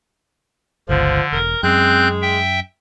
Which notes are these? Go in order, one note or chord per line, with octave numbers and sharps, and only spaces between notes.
G1 C#2 D3 F3
E1 A#4
F#2 G#3 C4 F#6 G6
E5 G5